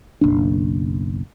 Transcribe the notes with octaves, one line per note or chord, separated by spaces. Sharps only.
F#1 B1 D4